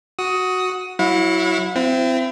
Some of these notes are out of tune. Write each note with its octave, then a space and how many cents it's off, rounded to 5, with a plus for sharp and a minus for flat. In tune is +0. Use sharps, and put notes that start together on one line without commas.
F#4 +0 D#6 +15
F#3 +0 E4 +0 F#5 -45
C4 -15 E4 +35